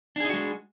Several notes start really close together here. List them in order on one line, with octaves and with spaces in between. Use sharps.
D4 G#4 D#4 F#4 G#3